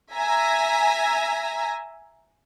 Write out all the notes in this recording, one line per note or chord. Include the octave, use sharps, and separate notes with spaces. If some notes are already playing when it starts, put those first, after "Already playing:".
E5 G#5 A#5